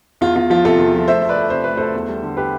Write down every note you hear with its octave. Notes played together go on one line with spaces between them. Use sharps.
E2 F4
E2 F4
F3 F4
C3 F4 A4
E2
F3
A3 C5 E5
D2
B4 D5
A3
C3 C5
A3 B4
D2 A4 C5
E2
G3
D3
G4 B4